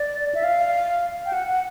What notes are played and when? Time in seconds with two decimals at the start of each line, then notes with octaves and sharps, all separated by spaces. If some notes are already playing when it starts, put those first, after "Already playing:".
Already playing: D5
0.35 E5
0.44 F5
1.26 G5
1.33 F#5
1.48 F#5